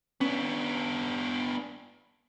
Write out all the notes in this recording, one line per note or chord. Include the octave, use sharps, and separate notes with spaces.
B3 C#4 D4